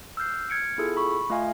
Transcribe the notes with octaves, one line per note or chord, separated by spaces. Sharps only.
E6 F6 G6 C7
F6 G#6 C#7 D7
B3 E4 F4 G#4 A4
B5 C#6
A3 F4 D#5 F5 G#5